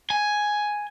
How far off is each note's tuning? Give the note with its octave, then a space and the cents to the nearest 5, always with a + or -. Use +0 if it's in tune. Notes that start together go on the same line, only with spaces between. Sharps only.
G#5 +5